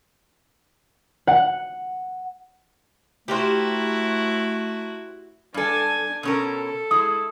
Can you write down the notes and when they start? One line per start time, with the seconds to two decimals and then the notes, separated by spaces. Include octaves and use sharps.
1.27 F#5
3.28 A3 E4 F#4 G4 A#4 C5
5.54 G2 D4 A4 G#5
6.23 B2 C#4 A4 A#4
6.91 G#3 E4 D#6